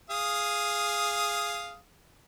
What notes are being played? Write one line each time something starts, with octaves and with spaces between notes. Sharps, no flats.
G#4 F5 D#6